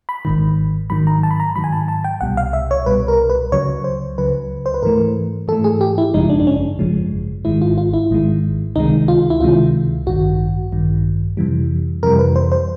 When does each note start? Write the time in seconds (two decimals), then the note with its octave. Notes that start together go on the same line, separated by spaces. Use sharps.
0.09 B5
0.25 G#1 G#2 D#3
0.90 G#2 D#3 F#3 B5
1.07 A#5
1.23 A5
1.31 B5
1.40 A#5
1.56 G#2 D#3 F#3 B5
1.64 G#5
1.73 A5
1.88 A5
2.04 G5
2.21 C2 B2 G3 F#5
2.37 F5
2.53 E5
2.71 C#5
2.86 C2 B2 G3 B4
3.08 A#4
3.30 B4
3.52 C#2 C#3 F#3 C#5
3.84 C5
4.18 C#2 C#3 F#3 B4
4.66 C5
4.74 B4
4.83 G#2 E3 A3 A#4
5.48 G#2 E3 A3 A4
5.64 G#4
5.81 G4
5.98 E4
6.14 G#1 F#2 C#3 F3 G#3 D#4
6.30 D4
6.40 D4
6.47 C#4
6.79 G#1 F#2 C#3 F3 G#3
7.45 G#1 G#2 D#3 G#3 E4
7.62 F4
7.78 F4
7.94 E4
8.11 G#1 G#2 D#3 G#3
8.76 C#2 C3 D#3 G#3 D#4
9.08 F4
9.30 E4
9.40 C#2 C3 D#3 G#3 F4
10.07 A1 G2 D#3 F#4
10.72 A1 G2 D#3
11.37 F2 C3 E3 G3
12.03 F2 C3 E3 G3 A#4
12.19 B4
12.36 C5
12.52 C5